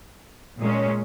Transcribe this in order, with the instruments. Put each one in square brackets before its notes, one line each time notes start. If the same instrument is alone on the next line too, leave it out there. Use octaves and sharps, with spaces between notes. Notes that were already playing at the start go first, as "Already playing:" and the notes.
[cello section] A#2 G#3 C#4